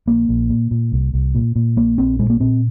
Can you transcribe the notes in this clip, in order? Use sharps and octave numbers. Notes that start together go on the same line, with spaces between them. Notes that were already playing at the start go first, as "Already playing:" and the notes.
A#1 A#3
A#1
A#2
A#2
C2
C2
A#2
A#2
A#1 A#3
A#1 C4
A#2 G#3
A#3
A#2 C4